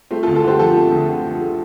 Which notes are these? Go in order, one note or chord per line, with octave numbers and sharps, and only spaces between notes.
A3 C4 F4
F4 A4
D2
F4 A4
D3 G4 C5
F3 F4 A4
A3
D2
D3
F3
A3